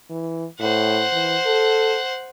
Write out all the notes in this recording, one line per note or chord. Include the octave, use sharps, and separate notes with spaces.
E3
A2 C5 F#5
E3
A4